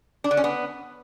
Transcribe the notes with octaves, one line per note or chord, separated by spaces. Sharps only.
D4
D3
C#4
B3